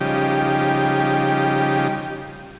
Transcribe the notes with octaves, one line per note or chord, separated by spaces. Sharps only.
C#3 F3 G3 D#4 G4